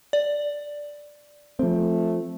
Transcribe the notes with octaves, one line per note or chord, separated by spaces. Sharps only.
D5
F3 A3 C4